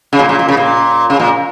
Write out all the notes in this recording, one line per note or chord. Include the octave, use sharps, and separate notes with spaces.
C#3
A#2
A#2
A#2
C#3
A#2
C#3
A#2